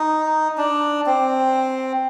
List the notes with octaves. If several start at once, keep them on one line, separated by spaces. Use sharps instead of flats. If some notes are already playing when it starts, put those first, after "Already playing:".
Already playing: D#4
D4
C4